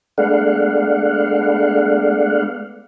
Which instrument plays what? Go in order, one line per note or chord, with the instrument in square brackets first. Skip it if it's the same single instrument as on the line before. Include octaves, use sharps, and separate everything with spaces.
[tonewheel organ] G#3 A3 B3 D4 F5 F#5